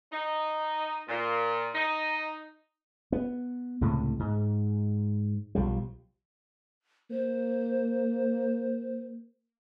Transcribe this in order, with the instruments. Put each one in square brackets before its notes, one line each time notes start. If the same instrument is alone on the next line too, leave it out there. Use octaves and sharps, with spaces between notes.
[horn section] D#4
A#2
D#4
[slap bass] B3
C#2 A2 C3
G#2
B1 F3 G3
[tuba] A#3 [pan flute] C5